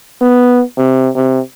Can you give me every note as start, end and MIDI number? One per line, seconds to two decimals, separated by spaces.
0.21 0.63 59
0.77 1.10 48
1.16 1.40 48